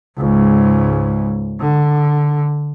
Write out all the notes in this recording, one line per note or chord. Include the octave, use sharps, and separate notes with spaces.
C#2 G#2
D3